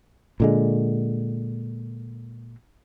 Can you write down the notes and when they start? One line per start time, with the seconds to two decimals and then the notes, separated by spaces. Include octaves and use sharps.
0.40 A#2 D3 G#3